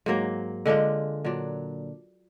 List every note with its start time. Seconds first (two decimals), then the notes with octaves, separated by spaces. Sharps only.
0.06 G#2 F#3 A#3
0.66 D3 G#3 D4 F4
1.25 A#2 F#3 D4